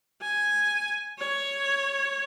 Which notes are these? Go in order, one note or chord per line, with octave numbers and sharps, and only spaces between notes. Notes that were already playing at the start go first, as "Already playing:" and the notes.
G#5
C#5